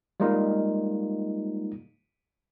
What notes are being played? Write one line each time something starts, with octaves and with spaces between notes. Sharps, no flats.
G3 G#3 A#3 D#4 F4